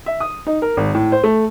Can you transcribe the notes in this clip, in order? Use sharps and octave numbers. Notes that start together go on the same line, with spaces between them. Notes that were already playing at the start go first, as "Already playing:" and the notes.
E5
D#6
D#4
A#4
G#1
A2
C5
A3